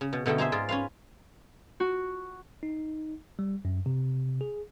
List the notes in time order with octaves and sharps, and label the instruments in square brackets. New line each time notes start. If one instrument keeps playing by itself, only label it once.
[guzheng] C#3
B2
B2 D3 A3 D#4 G5
D#4 G#4 C5 E5
G#2 F4 D5
C#4 B4 F5
[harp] F#4
[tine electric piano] D#4
G3
F#2
C3
G#4